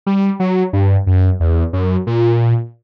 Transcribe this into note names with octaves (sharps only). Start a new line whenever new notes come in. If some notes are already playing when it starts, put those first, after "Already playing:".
G3
F#3
G2
F#2
E2
F#2
A#2